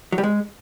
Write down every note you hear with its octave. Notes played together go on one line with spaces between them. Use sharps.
F#3
G3
G#3